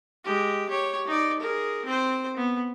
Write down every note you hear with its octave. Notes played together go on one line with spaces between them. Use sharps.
G#3 G4
G4 C#5
D#4 D5
G#4 A#4
C4 C5
B3